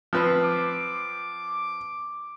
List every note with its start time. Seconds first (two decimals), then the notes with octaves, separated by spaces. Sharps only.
0.13 F3 C4 B4
0.43 D6